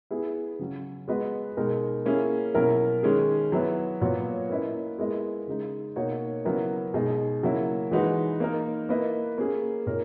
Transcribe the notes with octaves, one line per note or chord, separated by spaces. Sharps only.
B3 E4 G#4
C#3 F#3 C#4
G#3 B3 F#4 B4 D#5
B2 G#3 D#4 A#4
A#3 C#4 E4 G#4
B2 F#3 C#4 E4 A#4
D#3 G#3 C#4 G#4
F#3 B3 E4 B4
A#2 F#3 B3 F#4 C#5
A#3 C#4 E4 B4 D#5
G#3 B3 E4 A#4 D#5
C#3 G#3 D#4
B2 A#3 D#4 F#4 C#5
C#3 F#3 B3 E4 A#4
B2 G#3 D#4 G#4 D#5
C#3 F#3 A#3 E4
E3 G#3 D#4 F#4 B4
A#3 D#4 A#4
A#3 E4 B4 D#5
A#3 C#4 G#4
A#2 A#3 D#4 A#4 C#5